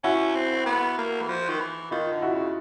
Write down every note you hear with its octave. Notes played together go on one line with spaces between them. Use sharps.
C#4 E4 F#4
C4
B3
A#3
E3
F3
D#3
E3
D#3 D#4 F4
D3
E4 F#4
C#3